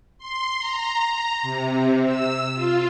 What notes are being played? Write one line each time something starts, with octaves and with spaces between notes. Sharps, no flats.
C6
A#5
A#5
C3
E6
F4